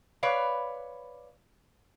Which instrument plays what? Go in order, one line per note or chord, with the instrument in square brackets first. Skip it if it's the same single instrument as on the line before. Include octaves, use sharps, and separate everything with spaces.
[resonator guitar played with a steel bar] B4 C#5 D5 F5